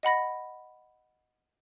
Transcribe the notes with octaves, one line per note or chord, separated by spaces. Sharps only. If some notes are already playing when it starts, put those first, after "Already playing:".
D#5 F#5 B5 A#6